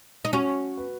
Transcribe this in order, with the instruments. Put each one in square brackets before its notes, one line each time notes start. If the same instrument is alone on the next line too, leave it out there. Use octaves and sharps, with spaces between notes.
[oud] D#4
[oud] C#4 [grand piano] F#4
[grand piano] B4